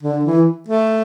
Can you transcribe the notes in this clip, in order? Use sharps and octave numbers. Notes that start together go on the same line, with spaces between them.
D3
E3
A3